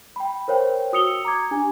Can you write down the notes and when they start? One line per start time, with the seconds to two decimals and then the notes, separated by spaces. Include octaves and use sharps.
0.16 G5 B5
0.48 A#4 C5 C#5 F5 G5
0.93 F#4 D#6 E6 C#7 F7 G7
1.25 A#5 D6 G#6
1.51 D4 G4 G#5